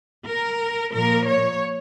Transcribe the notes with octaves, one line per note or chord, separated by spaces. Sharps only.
A#4
A#2 F3 A#3 A#4
C#5